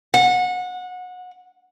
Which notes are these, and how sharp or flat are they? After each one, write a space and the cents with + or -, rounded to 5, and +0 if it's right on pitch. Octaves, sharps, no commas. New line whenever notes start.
F#5 -25